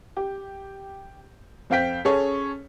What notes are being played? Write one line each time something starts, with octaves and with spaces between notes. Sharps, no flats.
G4
F2 C4 F5 G5 B6
C#4 G#4 A4 C#5